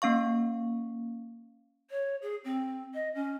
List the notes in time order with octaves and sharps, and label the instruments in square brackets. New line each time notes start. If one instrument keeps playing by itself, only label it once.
[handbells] A#3 C#4 F5 C#6
[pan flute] C#5
G#4
C4
D#5
C#4